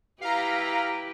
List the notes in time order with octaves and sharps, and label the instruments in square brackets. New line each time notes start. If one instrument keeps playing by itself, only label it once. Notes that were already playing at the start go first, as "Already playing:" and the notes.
[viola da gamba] E4 G4 B4 [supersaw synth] F5 A#5